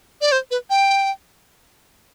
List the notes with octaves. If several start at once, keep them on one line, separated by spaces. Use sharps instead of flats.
D5
C5
B4
G5